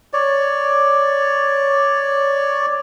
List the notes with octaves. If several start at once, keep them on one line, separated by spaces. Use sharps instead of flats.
C#5 D5